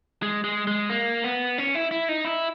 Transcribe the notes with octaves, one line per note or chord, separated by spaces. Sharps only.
G#3
G#3
G#3
A#3
B3
C#4
E4
E4
D#4
E4